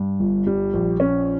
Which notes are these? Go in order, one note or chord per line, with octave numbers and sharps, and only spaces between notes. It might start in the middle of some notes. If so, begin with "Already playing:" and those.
Already playing: G2
G1
G3
A#1
C#4